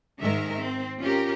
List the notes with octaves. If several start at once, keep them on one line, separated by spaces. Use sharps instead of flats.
G#2 D#3 G#3 A#4 E5
C4
C#4 F4 G4 A#4